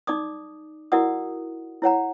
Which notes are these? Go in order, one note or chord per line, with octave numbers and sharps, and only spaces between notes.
D#4 D5 D6 D#6
E4 F#4 A#4 D5 F#5 D#6
E4 C#5 F#5 A#5